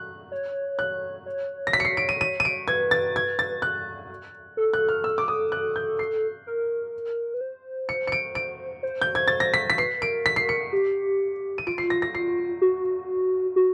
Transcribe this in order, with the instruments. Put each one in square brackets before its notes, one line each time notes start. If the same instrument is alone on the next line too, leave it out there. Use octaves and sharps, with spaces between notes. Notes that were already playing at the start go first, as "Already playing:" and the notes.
Already playing: [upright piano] F#6
[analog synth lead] C#5
[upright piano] F#6
[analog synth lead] C#5
[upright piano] A#6
B6
C#7
C7
D7
D#7
D#7
D#7
D7
[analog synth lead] B4 [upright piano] G#6
[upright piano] A6
G#6
A6
F#6
[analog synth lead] A4
[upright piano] F#6
F6
E6
D6
D#6
F#6
G6
C7
[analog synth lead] A#4
B4
C5
[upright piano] C#7
C#7
D7
D7
[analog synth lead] C5
[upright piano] G6
G#6
A6
A#6
B6
B6
[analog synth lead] B4 [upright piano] C7
[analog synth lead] A#4 [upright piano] D7
[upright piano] B6
C7
C#7
[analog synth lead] G4
[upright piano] D#7
[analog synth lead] F4 [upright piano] D7
[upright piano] C7
A#6
A#6
C7
[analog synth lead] F#4
F#4